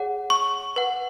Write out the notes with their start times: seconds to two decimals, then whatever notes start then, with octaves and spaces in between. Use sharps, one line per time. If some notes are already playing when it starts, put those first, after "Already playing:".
Already playing: G#4 C#5 F#5
0.30 C#6
0.76 B4 F#5